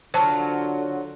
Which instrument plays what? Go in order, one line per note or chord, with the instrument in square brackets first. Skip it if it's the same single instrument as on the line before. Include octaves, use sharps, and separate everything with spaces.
[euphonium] D3 [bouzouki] F#3 F4 [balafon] C5 A5